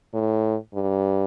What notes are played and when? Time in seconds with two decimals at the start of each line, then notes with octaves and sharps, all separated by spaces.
0.14 A2
0.74 G2